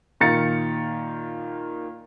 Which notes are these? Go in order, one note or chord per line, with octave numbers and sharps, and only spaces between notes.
A#2 D#3 F4 A#5 A6 C#7